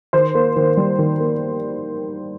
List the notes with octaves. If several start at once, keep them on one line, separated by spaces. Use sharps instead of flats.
D#3 C5
A#3
D#3
G3
D#3
A#3